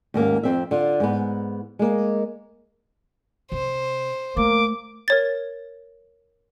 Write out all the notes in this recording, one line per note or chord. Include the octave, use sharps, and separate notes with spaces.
D#2 G#2 A#3 C#4
F2 C4 E5
D3 F4
G#2 B3
G#3 A#3
C3 C5
A3 A#3 D6
A#4 C#5 A6